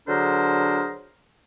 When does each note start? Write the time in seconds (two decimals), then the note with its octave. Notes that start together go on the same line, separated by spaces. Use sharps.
0.08 D3 F#3 D4 G#4 A#4 C5